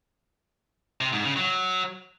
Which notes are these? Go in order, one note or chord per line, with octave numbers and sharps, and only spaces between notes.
C3
G#2
C#3
F#3